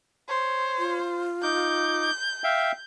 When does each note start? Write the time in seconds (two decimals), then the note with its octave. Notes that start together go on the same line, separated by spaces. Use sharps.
0.29 C5 C#5
0.79 F4
1.43 D#4 D6 G6
2.44 E5 F5 G5